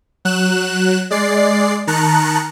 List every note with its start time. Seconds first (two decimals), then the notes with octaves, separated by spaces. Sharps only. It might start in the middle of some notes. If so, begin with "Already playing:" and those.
0.25 F#3 F#6 E7
1.11 G#3 D5 C7
1.87 D#3 A5 A#5 F#6 C#7